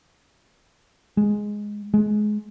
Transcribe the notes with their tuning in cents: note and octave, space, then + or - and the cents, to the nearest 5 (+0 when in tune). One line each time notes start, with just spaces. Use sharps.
G#3 +0
G#3 +20